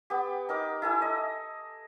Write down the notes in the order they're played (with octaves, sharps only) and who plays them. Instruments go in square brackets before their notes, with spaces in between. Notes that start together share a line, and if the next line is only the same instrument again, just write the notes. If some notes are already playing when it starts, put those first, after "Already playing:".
[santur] B3 G4
D#4 A#4 D6
E4 A4 G#5
D#5